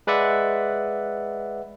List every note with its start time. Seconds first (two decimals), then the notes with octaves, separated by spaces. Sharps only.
0.07 G#3 B4 D5 E5 F#5